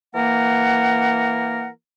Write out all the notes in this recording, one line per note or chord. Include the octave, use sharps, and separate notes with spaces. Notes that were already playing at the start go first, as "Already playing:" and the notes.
E3 A#3 A#4 F#5